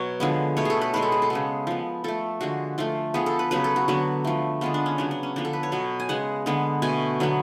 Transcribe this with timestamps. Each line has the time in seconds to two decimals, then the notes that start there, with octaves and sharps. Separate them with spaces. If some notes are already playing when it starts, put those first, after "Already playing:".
Already playing: B2 F#3 C#5
0.20 D3 F3 G#3 B3
0.57 B2 A3 C#5
0.65 G#4 A4
0.81 B4
0.93 B2 G#3 B3 B4
1.02 A4
1.12 G#4
1.22 A4
1.30 C#3 G#3 B3
1.67 F3 B3
2.04 F3 A3 A4
2.41 D3 F3 G#3 F#4
2.78 F3 A3 F4
3.14 F3 B3 G#4
3.26 A4
3.39 B4
3.51 C#3 F#3 B3 B4
3.64 A4
3.76 F#4
3.88 D3 F#3 B3 F#4
4.24 F3 A3
4.61 D3 G#3 B3 F4
4.74 D4
4.86 C#4
4.98 C#3 F#3 B3 D4
5.11 D4
5.23 C#4
5.36 D3 F3 B3 D4
5.45 A4
5.53 B4
5.63 C#5
5.72 B2 F#3 B3
6.00 G#5
6.09 C#3 G#3 B3 F#5
6.46 D3 G#3 B3
6.82 B2 A3 G#5
7.20 D3 F#3 B3